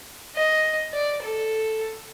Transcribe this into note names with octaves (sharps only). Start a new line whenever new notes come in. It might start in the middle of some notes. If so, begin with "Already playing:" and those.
D#5
D5
A4